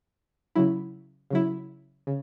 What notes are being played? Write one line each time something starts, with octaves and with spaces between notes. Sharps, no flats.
C#3 F#3 E4
C#3 F#3 E4
C#3